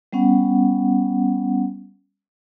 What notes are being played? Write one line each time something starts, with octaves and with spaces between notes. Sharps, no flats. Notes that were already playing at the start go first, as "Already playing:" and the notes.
G3 B3 C#4 F#5